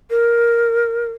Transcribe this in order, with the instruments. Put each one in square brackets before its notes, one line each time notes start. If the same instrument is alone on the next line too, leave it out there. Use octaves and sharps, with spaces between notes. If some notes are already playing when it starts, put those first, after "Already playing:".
[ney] A#4